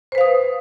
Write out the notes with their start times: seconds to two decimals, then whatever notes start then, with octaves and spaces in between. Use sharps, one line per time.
0.12 C5
0.15 B4
0.18 F5
0.21 D#6